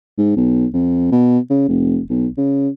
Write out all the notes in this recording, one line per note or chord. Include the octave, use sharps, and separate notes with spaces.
G#2
B1
F2
B2
C#3
F1
B1
C#3